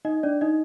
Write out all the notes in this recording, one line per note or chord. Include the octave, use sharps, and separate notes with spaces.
D#4 D#5
D4 D5
D#4 D#5